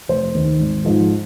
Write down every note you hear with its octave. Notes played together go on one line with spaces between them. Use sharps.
F1 C5
D#2 D#3
G#1
G#2 F3